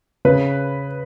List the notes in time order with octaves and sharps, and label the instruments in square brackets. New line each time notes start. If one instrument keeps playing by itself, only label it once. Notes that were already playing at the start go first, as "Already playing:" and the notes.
[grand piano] C#3 B4